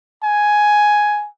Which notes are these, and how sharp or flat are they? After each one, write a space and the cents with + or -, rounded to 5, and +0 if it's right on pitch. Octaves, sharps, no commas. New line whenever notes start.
G#5 +5